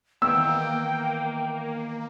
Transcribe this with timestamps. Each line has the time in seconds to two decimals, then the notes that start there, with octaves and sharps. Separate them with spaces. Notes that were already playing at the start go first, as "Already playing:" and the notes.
0.22 D#3 E3 A#3 B3 G5 E6